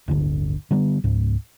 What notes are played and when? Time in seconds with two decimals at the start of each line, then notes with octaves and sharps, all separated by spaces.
0.08 D1 G1 D3
0.71 D3 G3 A#3 B3
1.04 C#2 G#2